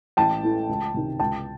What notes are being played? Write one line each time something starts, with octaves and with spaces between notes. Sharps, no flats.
A1 G5 A5
A2 E3 A3
C#2
C3 D#3
C#2 G5 A5